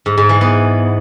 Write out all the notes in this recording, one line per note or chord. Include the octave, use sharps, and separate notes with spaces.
G#2
G#2
E3
B3